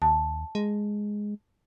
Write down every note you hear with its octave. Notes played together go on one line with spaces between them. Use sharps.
D#2 A5
G#3